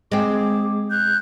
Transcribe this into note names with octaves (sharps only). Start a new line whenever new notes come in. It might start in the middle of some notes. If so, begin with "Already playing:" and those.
G#3 C4 G#4 D6
F#6 G6